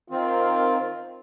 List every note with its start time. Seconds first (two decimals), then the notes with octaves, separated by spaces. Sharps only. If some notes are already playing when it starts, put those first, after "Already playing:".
0.11 D#3 C4 F4